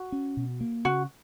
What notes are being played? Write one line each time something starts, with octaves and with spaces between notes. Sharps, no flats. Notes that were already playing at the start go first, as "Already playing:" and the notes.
Already playing: F#4
C#4
B2
A#3
C#3 F#4